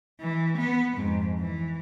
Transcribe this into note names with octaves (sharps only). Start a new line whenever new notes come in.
E3
B3
F2 G#2
E3